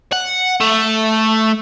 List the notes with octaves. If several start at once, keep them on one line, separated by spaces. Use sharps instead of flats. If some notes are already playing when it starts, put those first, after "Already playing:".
F#5
A3